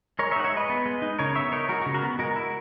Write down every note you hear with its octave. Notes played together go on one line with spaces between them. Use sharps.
G#3 A#4 C#5
C#5 E5
D#4 F#5
C#5 E5
G#3 B4 D#5
B3
G#3
D#4
C#3 A#4 C#5
B3 C#5 E5
D#4 A#4 C#5
G#3 F#4 A#4
F#4
C#3
F#4 A#4
B3
G#3 F#4 A#4
E4